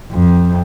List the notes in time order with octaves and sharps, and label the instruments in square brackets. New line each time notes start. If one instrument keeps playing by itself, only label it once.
[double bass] F2